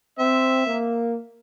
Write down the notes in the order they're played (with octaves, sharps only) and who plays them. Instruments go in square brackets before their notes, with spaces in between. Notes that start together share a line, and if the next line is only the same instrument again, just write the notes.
[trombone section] C4 [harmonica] E5
[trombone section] A#3